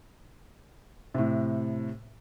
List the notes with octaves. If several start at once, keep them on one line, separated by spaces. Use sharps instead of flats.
A2 C3